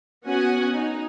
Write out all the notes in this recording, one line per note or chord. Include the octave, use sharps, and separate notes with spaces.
B3 C#4 F#4 F#5 G#5
D#4